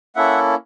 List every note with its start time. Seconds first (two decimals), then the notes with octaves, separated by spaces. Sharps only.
0.16 A#3 C#4 E4 A4 E5 F#5